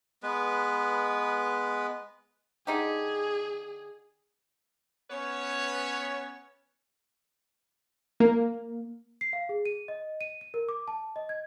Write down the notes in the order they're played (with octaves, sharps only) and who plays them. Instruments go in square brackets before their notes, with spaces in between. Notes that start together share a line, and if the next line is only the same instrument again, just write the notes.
[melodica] G#3 B3 B4
[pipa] D3 D#4 G4 [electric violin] G#4
[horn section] B3 C#4 B4 C#5
[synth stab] A#3
[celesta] C7
F5
G#4
D#7
D#5
D#7
D#7
A#4
D6
A5
D#5
G#6